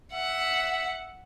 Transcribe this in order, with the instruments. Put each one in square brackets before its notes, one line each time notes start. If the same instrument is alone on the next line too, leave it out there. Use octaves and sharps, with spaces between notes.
[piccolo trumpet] E5 [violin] F#5